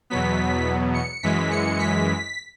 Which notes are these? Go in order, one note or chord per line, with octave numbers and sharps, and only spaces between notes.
E2 B2 F#3 B3 B6
C#7
F#2 E3 G#3 B6
C#7
B6